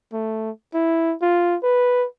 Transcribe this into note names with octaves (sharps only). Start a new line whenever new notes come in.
A3
E4
F4
B4